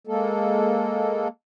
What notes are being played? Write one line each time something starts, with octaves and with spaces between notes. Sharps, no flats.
G#3 A#3 A4